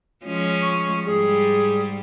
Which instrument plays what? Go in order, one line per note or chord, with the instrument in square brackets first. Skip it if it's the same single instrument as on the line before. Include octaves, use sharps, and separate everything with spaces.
[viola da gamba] F3 G#3 C#4
[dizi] C#6
[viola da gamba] G#2 G3 [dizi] G#4